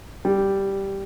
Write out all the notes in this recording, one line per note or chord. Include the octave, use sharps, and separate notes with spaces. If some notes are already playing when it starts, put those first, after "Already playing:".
G3